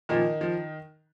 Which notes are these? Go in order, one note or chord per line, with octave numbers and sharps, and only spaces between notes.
A#2 D#3 F3 D#4
F3